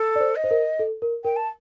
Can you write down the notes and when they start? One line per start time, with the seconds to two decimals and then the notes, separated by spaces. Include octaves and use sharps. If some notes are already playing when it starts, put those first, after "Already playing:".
Already playing: A4
0.16 D5
0.20 C5
0.36 D#5
0.44 C5
0.51 A#4
0.79 A4
1.02 A#4
1.24 A#4 G5
1.36 A5